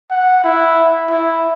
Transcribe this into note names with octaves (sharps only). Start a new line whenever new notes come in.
F#5
E4
E4